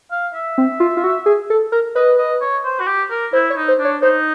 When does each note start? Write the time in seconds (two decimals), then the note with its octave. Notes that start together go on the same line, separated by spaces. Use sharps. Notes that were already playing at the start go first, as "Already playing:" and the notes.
0.11 F5
0.34 E5
0.58 C4
0.80 F4
0.97 F4
1.04 F#4
1.26 G#4
1.50 A4
1.72 A#4
1.96 B4 D#5
2.18 D#5
2.42 C#5
2.65 C5
2.80 F#4
2.87 G4
3.10 A#4
3.33 E4 C5
3.50 C#5
3.56 D#4
3.68 C5
3.80 D4
3.85 C#5
4.02 D#4 C5